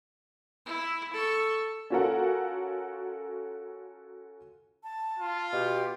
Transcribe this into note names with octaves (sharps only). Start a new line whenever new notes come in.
E4
A4 C#6
C#4 F4 F#4 A4 A#4 F#5
A5
F4
B2 G4